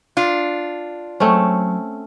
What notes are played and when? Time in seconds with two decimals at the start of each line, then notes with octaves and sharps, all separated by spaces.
0.17 D4 F4
1.20 F#3 A3 C4 C#4